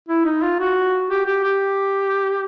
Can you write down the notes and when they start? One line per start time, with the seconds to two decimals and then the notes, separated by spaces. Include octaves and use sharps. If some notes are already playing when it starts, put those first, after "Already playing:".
0.09 E4
0.25 D#4
0.42 F4
0.59 F#4
1.10 G4
1.26 G4
1.44 G4